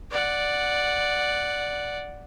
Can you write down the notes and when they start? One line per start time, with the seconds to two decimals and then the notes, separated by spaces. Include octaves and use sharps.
0.11 D5 F#5